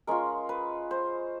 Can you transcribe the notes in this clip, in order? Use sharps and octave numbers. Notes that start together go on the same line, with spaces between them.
G#3 C#4 F4 A#4
B4
C5